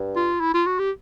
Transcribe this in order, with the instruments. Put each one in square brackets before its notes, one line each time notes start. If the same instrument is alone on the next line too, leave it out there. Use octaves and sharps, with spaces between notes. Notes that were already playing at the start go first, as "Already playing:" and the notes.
Already playing: [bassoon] G2
[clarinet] F4
E4
F4
F#4
G4